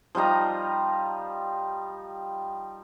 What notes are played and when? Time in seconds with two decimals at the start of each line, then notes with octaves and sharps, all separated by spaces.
0.15 F3 G3 D#4 A#5